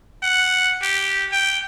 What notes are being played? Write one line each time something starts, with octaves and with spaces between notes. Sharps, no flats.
F#5
G4
G5